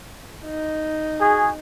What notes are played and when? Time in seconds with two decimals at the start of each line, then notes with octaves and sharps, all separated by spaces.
0.45 D#4
1.20 F#4 G#4